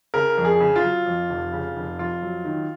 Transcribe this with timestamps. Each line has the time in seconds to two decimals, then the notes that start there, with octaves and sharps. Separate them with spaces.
0.14 C#3 A#4
0.38 F2
0.45 G#4
0.60 C#3
0.76 F4
0.83 F#3
1.06 F2
1.30 F1
1.53 C#3
1.76 F1
1.99 F2 F4
2.22 F#3
2.45 D#3